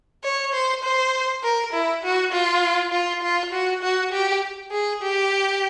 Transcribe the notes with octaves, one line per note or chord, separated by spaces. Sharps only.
C#5
C5
C5
A#4
E4
F#4
F4
F4
F4
F#4
F#4
G4
G#4
G4